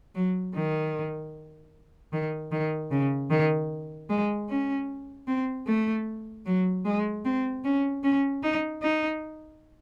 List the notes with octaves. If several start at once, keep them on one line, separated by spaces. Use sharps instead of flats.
F#3
D#3
D#3
D#3
C#3
D#3
G#3
C#4
C4
A3
F#3
G#3
C4
C#4
C#4
D#4
D#4